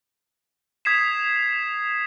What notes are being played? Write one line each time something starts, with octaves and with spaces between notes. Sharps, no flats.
D#6 G#6 B6 C7 E7